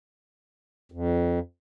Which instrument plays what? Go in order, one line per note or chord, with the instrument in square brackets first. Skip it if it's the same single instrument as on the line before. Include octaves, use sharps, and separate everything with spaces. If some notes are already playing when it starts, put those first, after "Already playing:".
[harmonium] F2